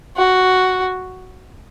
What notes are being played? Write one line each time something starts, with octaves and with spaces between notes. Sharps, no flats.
F#4